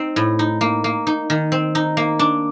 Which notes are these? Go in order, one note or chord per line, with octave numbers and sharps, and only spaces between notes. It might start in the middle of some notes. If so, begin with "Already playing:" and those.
Already playing: C4 D#4
A2
D#4
A#3
A#3
D#4
D#3
C4
D#4
A#3
D4